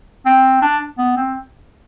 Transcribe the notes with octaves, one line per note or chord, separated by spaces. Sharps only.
C4
D4
B3
C4